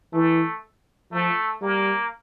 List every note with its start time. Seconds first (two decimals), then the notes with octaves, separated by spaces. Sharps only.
0.13 E3 A3
1.12 F3 A3
1.62 G3 A#3